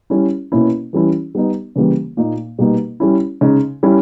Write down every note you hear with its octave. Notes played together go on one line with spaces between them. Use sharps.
G3 C#4 E4
B2 A#3 C#4 E4
E3 G3 C#4 E4
G3 B3 D#4
C#3 E3 G3 A#3
A#2 A#3 D#4
B2 G3 A#3 D#4
G3 C#4 E4
C#3 G#3 D#4
G3 C#4 E4